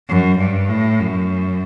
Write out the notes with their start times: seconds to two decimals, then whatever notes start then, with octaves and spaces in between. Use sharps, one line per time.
0.09 F#2
0.38 G2
0.69 A2
0.99 F#2